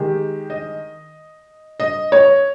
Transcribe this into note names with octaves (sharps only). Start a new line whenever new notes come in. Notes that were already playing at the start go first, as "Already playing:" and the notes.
Already playing: D#3 G#3 G4
D#5
D#5
C#5